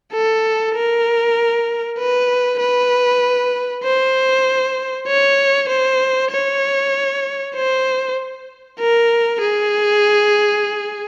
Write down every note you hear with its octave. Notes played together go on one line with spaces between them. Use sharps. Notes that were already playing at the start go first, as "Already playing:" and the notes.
A4
A#4
B4
B4
C5
C#5
C5
C#5
C5
A#4
G#4